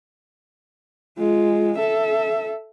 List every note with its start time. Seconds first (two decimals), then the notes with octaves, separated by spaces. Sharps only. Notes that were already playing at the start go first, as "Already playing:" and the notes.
1.18 G#3 F4
1.78 A4 E5